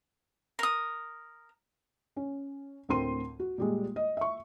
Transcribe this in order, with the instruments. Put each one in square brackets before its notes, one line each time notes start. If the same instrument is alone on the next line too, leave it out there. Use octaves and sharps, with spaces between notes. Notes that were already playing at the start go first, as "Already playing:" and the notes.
[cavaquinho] A#4 D#6
[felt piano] C#4
D2 A2 C4 A#4 C6 D#7
F#4
A#2 G3 G#3
D#5
E5 C#6